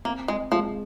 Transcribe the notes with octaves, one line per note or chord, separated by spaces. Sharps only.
A#3 C4
G#3
F3 G#3